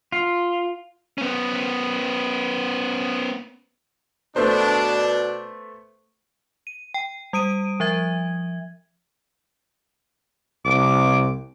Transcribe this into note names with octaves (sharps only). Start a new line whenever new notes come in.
F4
B3 C#4
B2 A3 B3 D4 C5
D#7
G5
G3 D#6 D7 D#7
F3 E5 G#6
C2 D6